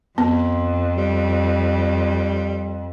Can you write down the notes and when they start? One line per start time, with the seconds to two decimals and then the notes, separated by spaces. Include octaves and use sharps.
0.18 F2 B3
0.97 G3